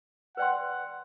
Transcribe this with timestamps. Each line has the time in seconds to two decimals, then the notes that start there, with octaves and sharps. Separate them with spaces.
0.37 B4 D5 F#5 G5 C6